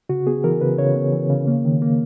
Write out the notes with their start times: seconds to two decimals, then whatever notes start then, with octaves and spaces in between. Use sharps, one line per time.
0.09 C#3 F#4
0.27 B3 G#4
0.44 E3 A#4
0.61 C#3 B4
0.78 C#3 C#5
0.96 B3
1.13 E3
1.30 C#3
1.47 A#3
1.65 D#3
1.82 A#3